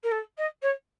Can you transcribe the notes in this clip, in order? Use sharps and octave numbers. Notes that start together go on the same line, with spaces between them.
A#4
A4
D#5
C#5